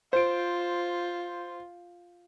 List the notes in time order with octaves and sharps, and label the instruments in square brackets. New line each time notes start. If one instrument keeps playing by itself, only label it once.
[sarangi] F4 [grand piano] C5 D7